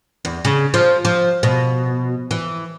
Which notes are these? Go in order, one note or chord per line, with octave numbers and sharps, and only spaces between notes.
E2
C#3
F3
F3
B2
E3